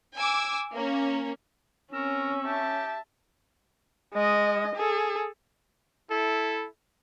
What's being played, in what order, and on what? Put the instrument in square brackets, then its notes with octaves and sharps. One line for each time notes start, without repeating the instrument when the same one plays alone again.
[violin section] G#5 D6 E6
A#3 C#4
[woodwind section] C4 C#6 E6 [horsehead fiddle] C#4 [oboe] A#4
[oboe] G4 [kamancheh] E5 A5
[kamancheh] G#3 D#5
G#4 A4
[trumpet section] E4 A4